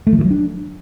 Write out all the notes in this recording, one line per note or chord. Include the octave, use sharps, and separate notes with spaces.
A3
F3
E3
F#3
D4